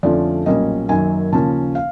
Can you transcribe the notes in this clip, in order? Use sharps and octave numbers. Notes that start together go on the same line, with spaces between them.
F2 D3 F3 A3 C#4 D5
B1 A#2 G3 A#3 C#4 D#5
F#2 D#3 F#3 A#3 G#5
D#2 C#3 F3 A#3 C#4 A5
F5